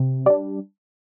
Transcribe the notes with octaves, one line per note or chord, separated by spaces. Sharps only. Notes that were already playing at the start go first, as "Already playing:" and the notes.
Already playing: C3
G3 D4 D5